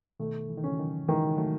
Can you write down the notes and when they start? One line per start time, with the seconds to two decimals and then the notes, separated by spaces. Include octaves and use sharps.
0.20 B2 D#3 A3
0.49 E3
0.58 D#3
0.64 C#3 E3 C#4
0.79 D#3 F#3
1.09 D#3 E3 G#3
1.38 F#3 A3